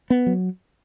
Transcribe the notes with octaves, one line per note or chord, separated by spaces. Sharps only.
B3
F#3